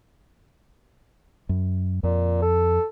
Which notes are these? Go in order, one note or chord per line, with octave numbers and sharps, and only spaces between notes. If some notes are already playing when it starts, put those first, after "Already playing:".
F#2
F2 A#2
A4